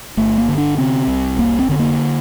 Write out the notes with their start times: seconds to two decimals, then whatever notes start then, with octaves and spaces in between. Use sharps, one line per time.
0.17 G1 A3
0.37 A#3
0.48 D3
0.58 D4
0.78 C3 C4
1.08 C2
1.39 F1 A#3
1.59 C4
1.69 D3 C4
1.79 A#3